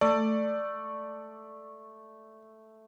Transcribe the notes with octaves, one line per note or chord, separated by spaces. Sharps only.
A3 D5